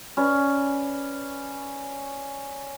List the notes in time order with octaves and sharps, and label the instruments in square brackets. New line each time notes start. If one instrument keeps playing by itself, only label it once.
[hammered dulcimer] C#4 B4 D5